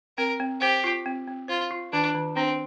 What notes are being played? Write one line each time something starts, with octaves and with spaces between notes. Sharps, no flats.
C4 A#4
C4
G4 C5
F4
C4
C4
F4 C5
F4
D#3 D4
D#3
C4 D4